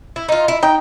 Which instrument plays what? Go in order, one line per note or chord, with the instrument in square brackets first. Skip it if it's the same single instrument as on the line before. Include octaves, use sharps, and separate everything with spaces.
[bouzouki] E4
D#4 F4
E4
[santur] D#4 [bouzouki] G5